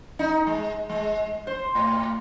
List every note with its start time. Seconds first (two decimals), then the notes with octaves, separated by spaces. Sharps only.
0.19 D#4
0.47 G#3
0.89 G#3
1.47 C5
1.75 A2